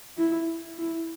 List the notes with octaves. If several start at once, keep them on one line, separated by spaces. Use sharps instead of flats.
E4
E4